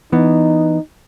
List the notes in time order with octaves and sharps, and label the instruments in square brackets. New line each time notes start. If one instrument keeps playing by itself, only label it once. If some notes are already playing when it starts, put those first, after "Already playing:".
[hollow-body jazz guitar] E3 B3 [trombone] D#4